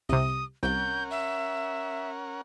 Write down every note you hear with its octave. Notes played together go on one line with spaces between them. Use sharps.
C2 C3 D#6
C2 C#4 A#4 F#5 G6
E5